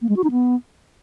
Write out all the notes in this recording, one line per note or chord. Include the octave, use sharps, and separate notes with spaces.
A#3
G#3
F#4
D#4
B3